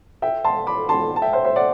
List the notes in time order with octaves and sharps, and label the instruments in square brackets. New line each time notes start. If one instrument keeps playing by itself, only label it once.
[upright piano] E5 G5
A5 C6
B5 D6
A5 C6
A5
E5 G5
C5 E5
C5 E5
D5 F#5